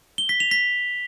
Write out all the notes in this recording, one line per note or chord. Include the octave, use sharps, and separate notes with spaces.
G7
B6
F7
B6